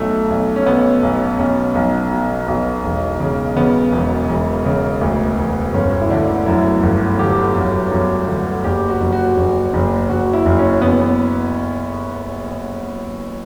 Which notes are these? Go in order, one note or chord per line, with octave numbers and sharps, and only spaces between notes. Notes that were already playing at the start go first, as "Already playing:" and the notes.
Already playing: B1 A3
B1
C#4
B2 B3
B1
B1 C#4
B1
B2
B1
E1
C#3
C#3 B3
E1
E1
C#3
D2
E1
G1 C#4
E4
D3 D4
F#2 E4
G1
D3 G4
F#2
F#2
D3
F#1 G4
F#4
F#1
F#4
F#1
F#1
F#1 F#4
E4
F#1
C#4
F#1 B3
B3